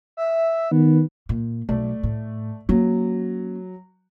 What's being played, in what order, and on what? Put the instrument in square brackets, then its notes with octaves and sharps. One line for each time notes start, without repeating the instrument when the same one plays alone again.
[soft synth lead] E5
[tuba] D#3 [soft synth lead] B3
[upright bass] A#2
[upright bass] B1 [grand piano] A3 D5
[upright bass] A2
[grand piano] F#3 [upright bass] A#3 C#4